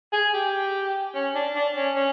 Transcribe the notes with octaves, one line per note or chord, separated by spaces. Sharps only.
G#4
G4
C#4
D4
D4
C#4
C#4